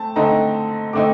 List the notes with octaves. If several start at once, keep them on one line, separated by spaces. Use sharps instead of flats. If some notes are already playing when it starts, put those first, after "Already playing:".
Already playing: A3 C4 A5
D3 A3 C4 D#4 A#5
D3 A3 C4 D#4 D6